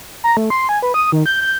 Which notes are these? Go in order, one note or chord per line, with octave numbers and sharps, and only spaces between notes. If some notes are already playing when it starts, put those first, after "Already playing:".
A#5
A3
C6
G#5
B4
D#6
D#3
G6
G6